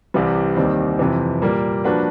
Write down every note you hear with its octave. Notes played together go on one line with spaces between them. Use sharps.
C2 C3 E3 G3
D#2 D#3 G3 C4
F2 C3 E3
A#2 G3 A#3
F3 A#3 D4 F#4 B4